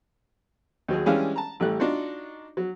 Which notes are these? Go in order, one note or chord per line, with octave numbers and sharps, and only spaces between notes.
D#2 F#3 G#4
E3 G3 G#3 C#4 D4 F5
A5 A#5
A1 G3 A3 F#6
D4 D#4 F4 F#4
F#3